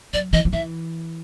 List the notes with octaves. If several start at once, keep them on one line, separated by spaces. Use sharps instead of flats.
F#3 D5
E3 D#5
F3
E3 E5